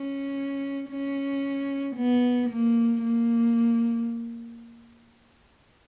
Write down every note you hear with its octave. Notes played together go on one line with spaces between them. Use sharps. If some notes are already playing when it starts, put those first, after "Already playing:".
Already playing: C#4
C#4
B3
A#3
A#3